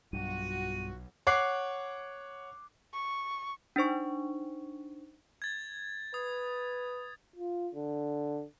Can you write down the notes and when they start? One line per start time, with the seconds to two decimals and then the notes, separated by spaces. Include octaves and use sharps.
0.13 B1 G2 F#3 F4 F#4 D#7
1.27 C#5 F#5 D6 F#6 C7
2.93 C#6
3.76 D4 D#4 C5 C#6
5.42 G#6 A6
6.14 B4 D#6
7.36 F4
7.75 D3